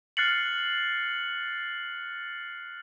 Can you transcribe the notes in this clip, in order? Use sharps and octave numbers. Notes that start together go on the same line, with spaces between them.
F6 F#6 A6 C7 C#7 F#7